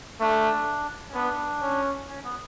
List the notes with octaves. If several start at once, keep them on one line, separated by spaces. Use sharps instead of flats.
A3 D4
C#4
B3 D4
C#4
C#4
B3